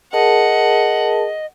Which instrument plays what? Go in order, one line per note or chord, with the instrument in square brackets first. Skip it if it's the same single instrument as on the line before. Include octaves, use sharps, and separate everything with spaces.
[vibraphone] G#4 A#4 A5 [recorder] D#5 [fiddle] F#5